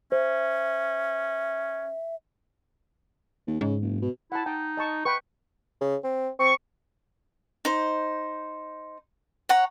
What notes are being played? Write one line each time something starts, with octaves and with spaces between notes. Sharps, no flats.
C#4 C5 E5
D#2
G#2 C#3
F#1
B2
E4 F#5 A5
D#4 G5
D#5 A5 C#6
B4 G5 C#6
C#3
C4
C4 C#6
D#4 C5
C#5 F#5 A#5